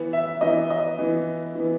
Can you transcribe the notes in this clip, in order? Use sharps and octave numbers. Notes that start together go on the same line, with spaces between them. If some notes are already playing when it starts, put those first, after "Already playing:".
Already playing: E3 B3
E5
E3 B3 D#5
D#5
E3 B3
E3 B3